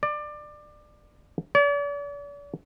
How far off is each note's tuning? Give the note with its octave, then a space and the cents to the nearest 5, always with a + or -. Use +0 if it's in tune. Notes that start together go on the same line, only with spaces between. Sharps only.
D5 +20
D5 -45